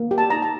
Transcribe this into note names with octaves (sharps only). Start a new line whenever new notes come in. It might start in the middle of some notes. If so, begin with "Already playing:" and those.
Already playing: A#3
G4
A5
D#4 A#5
A5